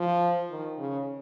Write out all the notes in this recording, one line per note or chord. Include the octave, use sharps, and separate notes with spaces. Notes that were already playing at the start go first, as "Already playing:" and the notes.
Already playing: F3
D#3
C#3